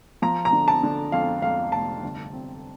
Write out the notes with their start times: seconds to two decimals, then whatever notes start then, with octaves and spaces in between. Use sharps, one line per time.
0.22 F3 A#5
0.45 A#5
0.53 D3
0.68 A5
0.83 D3
1.12 F2 F5
1.42 F2 F5
1.72 F1 A5
2.03 G1
2.33 C4